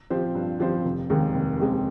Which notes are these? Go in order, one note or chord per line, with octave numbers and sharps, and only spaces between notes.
F3 C4 G4 C5
G2
F3 C4 G4 C5
F1
D#2 D#3 G#3 C4
F1
D#2 D#3 G#3 C4